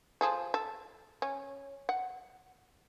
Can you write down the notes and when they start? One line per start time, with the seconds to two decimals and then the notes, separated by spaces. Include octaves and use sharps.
0.21 F3 G#4 A4
0.54 A4
1.22 C#4
1.89 F#5